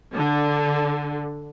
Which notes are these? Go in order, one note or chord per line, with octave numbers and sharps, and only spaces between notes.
D3